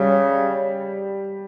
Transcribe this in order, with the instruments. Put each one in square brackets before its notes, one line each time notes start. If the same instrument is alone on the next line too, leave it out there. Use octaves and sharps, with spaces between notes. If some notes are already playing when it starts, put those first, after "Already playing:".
Already playing: [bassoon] C#3 [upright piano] G3